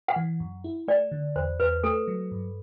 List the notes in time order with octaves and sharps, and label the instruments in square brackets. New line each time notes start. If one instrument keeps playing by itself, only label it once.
[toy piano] F#5
[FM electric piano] E3
F#2
E4
[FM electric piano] A3 [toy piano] D5
[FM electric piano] D3
[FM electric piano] E2 [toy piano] C5
[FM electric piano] E2 [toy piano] B4
[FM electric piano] A3 [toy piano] A4
[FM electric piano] F#3
G2